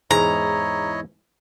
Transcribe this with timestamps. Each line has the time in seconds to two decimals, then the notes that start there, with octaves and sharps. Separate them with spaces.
0.11 E2 G#2 G#3 E4 C#5 D#5 A#5